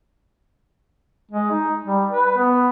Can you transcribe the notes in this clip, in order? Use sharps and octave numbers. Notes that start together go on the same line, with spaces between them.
G#3
D#4
G3
B4
B3